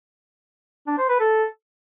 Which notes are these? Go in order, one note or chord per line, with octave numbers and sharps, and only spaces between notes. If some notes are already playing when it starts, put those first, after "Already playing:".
D4
C5
B4
A4